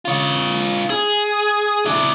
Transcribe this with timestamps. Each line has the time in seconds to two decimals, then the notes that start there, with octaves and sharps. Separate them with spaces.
0.05 F4 C#5
0.90 G#4
1.86 D4 E4